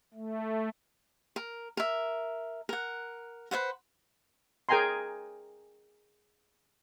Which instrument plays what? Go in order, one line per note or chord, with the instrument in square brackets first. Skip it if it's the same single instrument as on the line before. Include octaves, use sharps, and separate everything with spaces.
[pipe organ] A3
[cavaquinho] A#4
A#4 E5
A#4 F#5
B4 C5 F5 F#5
[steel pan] G#4 A#4 G5 G#5 A#5 C6